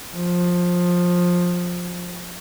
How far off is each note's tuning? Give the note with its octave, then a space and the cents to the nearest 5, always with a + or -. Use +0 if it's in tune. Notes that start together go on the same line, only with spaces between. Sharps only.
F3 +15